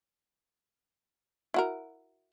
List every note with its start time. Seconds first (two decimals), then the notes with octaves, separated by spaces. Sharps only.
1.54 E4 F#4 A#4